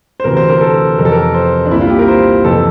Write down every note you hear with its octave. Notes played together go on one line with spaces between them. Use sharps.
C5
D2 C3 E3 A#4
C5
A#4
A4
F2 C3 E3 A#4
A4
A#4
C5
D4
C2 A#2 E4
F4
G4
A#4
C5
F2 C3 E3 A4